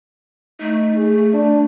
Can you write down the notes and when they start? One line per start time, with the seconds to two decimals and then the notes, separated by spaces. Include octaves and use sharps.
0.60 A3 D#4
0.97 G#4
1.34 D4